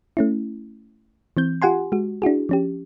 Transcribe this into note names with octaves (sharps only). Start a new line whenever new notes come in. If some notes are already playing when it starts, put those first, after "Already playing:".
A3 C#4 E4
E3 C4 G6
F4 G4 F#5 G#5 C6
G#3 F#4
D4 E4 F#4 G#4
F3 C#4 G4